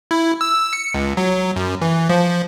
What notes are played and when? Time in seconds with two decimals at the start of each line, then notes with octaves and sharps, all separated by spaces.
0.11 E4
0.41 E6
0.73 C#7
0.94 C#2
1.17 F#3
1.56 F#2
1.81 E3
2.09 F3